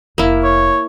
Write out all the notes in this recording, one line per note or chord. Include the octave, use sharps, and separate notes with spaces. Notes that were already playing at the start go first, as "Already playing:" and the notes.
F1 A#3 E4
C#5